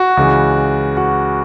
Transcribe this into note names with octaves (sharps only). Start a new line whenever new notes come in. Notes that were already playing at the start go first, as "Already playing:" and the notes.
Already playing: F#4
C#2 C#3 E3
F#4